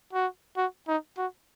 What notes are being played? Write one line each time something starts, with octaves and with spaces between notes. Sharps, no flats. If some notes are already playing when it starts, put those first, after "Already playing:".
F#4
F#4
D#4
F#4